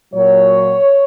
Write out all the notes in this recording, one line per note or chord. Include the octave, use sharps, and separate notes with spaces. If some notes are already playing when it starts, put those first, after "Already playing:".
A#2 F#3 C#5